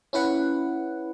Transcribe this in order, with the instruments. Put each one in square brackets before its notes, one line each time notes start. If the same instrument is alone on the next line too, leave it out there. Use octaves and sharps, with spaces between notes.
[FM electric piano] C#4 E4 B4 F#5